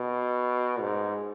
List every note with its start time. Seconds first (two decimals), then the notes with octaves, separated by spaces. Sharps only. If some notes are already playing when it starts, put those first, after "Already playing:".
Already playing: B2
0.80 G#2